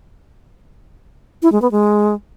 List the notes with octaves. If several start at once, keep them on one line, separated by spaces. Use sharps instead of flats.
E4
G#3
B3
G#3